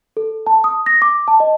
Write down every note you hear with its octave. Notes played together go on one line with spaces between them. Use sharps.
A4
A5
D#6
A#6
D6
A5
D#5